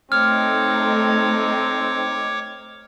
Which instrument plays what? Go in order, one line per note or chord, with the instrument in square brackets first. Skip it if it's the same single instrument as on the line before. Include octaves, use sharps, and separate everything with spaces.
[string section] A3 D#4 [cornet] C4 [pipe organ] C#5 D6 [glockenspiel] F6